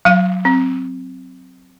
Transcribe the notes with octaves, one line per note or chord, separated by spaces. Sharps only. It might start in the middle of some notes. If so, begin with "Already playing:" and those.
F#3 F5
C4